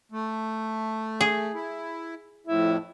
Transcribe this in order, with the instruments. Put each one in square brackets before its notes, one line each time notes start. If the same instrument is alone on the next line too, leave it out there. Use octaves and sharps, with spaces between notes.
[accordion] A3
[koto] G#4
[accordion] E4
[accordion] F2 A2 [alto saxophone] E4